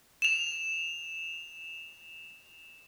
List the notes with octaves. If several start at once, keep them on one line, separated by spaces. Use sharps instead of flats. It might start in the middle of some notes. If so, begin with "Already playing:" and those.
E7 F7